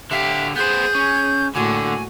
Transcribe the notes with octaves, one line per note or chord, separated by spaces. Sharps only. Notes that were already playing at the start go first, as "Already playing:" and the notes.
D3 G4 E5 F5
B3 G#4 C5 G6
C#4
A2 D3 A#3 F#4 G#5